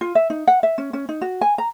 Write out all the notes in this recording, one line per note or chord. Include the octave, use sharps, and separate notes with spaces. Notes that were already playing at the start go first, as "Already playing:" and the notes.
F4
E5
D#4
F#5
E5
C#4
C#4
D#4
F#4
G#5
A#5